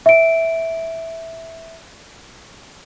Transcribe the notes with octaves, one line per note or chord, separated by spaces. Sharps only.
E5 D7